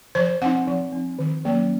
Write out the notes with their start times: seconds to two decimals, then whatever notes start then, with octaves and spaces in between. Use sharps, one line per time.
0.15 F3 C5
0.42 C4 F#5
0.46 D#4
0.67 F3
0.92 C4 D#4
1.19 D#3
1.45 F#3 A#3 C#4